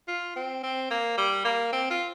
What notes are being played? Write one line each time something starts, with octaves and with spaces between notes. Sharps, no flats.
F4
C4
C4
A#3
G3
A#3
C4
F4